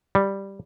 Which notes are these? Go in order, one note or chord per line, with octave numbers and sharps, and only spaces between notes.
G3